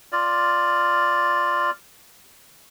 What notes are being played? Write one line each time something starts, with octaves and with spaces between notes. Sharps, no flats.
F4 D5